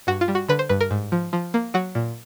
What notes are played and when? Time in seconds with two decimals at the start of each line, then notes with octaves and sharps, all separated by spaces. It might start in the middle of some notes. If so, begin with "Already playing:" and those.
0.07 G2 F#4
0.21 F4
0.28 G3
0.35 F#4
0.49 D3 B4
0.59 C5
0.69 G2 B4
0.81 A#4
0.91 G#2
1.12 F3
1.33 F3
1.54 A#3
1.74 F#3 F#4
1.95 A#2